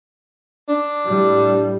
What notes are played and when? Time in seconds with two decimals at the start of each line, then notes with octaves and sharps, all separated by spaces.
0.69 D4
1.06 A2 G3